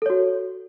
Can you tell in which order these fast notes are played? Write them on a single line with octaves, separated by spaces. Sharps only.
A4 C#5 F#4